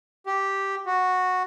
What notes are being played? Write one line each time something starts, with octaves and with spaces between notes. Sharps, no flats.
G4
F#4